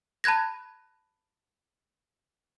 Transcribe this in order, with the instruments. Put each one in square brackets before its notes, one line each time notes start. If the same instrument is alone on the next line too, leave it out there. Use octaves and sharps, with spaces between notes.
[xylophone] A5 B5 F#6 G#6 A#6